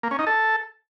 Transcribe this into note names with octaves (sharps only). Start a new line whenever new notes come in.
A#3
C#4
D#4
A4